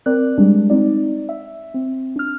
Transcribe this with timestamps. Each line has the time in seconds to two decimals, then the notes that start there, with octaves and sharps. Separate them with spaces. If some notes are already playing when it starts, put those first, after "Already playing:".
0.06 C4 A#4 D5 F#6
0.38 G3 G#3 D4
0.70 C4 D#4 D5
1.29 E5
1.74 C4
2.16 D4 F6